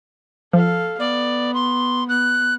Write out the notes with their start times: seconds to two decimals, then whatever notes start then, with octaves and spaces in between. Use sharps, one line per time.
0.53 F3 A4 F5
1.00 B3 D5
1.54 C6
2.09 B3 F#6